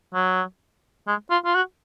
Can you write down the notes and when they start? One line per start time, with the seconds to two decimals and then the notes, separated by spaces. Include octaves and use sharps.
0.14 F#3
1.08 G#3
1.30 F4
1.45 F4
1.55 F#4